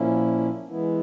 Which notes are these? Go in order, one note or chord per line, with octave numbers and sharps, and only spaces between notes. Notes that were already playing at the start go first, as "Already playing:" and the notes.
Already playing: A#2 F3 A#3 C#4 E4
E3 G#3 B3 E4